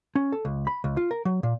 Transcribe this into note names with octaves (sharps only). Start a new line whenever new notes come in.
C#4
A4
C#2
B5
C#2
F4
A#4
F#3
A#2